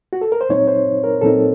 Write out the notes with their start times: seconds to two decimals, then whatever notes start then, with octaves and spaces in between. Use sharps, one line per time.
0.13 F#4
0.21 A4
0.32 A#4
0.41 C5
0.49 A#2 F#3 C4 D#4 C#5
0.68 C5
1.04 A#4
1.21 A#2 F#3 C4 D#4 A4